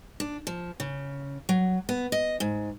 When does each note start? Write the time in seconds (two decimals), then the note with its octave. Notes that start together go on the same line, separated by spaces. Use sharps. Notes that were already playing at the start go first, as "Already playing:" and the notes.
0.20 D4
0.47 F3
0.80 C#3
1.49 F#3
1.89 B3
2.12 D#5
2.40 G#2